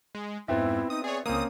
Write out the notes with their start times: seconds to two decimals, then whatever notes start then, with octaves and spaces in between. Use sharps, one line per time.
0.15 G#3
0.48 F2 G#2 B3 C4 E4 E5
0.90 D#4 D#6
1.04 G#4 C#5 D5
1.26 C#2 A#3 C4 C#4 D#6